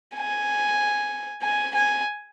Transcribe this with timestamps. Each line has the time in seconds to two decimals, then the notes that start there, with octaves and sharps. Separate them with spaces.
0.16 G#5
1.42 G#5
1.74 G#5